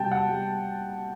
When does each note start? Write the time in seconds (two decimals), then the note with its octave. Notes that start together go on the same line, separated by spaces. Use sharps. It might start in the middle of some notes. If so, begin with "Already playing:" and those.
Already playing: C3 G3 G5 A5
0.11 F#5
0.29 G3